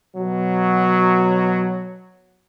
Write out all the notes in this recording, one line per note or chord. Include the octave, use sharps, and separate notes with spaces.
B2 F#3